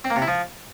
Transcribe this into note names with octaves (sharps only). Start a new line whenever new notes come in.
C4
A#3
C3
E4
F3